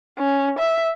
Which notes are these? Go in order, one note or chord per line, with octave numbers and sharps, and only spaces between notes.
C#4
E5